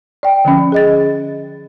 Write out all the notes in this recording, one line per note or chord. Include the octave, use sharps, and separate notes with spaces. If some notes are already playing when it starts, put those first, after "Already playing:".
D5 G5
D3 F3 C#4
G#4 D#5 A6